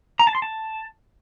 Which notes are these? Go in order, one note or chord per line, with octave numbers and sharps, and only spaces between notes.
A#5
A5
C6
A5